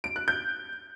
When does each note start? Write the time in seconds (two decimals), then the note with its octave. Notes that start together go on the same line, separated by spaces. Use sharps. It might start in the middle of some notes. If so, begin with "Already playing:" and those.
0.04 D7
0.16 F#6
0.28 G6